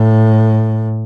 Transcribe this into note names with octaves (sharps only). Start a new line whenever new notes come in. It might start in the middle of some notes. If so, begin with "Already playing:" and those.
Already playing: A2